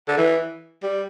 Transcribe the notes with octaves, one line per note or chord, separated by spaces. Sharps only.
D3
E3
G3